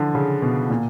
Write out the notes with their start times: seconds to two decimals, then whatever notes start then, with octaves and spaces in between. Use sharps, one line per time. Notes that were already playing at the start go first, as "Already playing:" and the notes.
Already playing: D3 E3 F3
0.15 C#3
0.42 B2
0.70 A#2